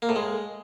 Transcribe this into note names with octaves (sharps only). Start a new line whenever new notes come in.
A#3
A2
G#3